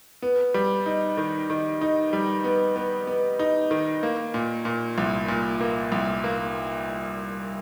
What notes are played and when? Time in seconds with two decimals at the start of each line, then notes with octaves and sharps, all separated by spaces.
0.22 B3
0.54 G3
0.86 D#4
1.17 D#3
1.50 D#3
1.81 D#4
2.13 G3
2.44 B3
2.76 B3
3.07 B3
3.39 D#4
3.71 D#3
4.03 A#3
4.34 A#2
4.65 A#2
4.98 C2
5.28 A#2
5.60 A#3
5.92 C2
6.24 A#3